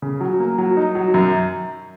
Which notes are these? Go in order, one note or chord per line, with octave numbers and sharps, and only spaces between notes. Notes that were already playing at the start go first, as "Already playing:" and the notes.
C#3
F#3
A#3
F#3
D#4
F#3
F#2